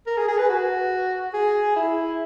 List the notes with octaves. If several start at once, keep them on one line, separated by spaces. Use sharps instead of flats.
A#4
G#4
G#4
B4
F#4
G#4
E4